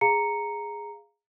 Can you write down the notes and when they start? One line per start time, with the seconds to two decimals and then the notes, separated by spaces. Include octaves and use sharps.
0.01 G#4 F5 A#5 C#7